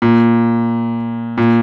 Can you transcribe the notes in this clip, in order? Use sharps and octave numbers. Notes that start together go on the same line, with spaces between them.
A#2
A#2